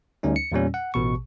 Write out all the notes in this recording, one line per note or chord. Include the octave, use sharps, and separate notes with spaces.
D2 G3 C#4 D#4
C#7
E2 A#2 G3 C#4
F#5
A1 B2 C#6